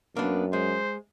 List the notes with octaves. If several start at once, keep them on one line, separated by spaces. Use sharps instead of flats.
F#2 A#3 B3 D4
G#3 C5